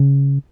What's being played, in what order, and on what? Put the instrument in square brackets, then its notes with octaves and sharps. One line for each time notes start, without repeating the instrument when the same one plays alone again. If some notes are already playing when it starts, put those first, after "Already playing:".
Already playing: [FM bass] C#3